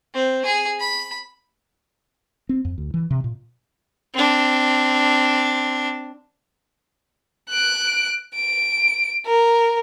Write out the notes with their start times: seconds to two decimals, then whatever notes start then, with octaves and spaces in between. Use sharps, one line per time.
0.14 C4
0.45 G#4
0.79 B5
2.49 C4
2.65 F2
2.78 D2
2.94 E3
3.11 C3
3.24 A#2
4.14 C4 D4
7.50 F#6 D7
8.35 D7
9.26 A#4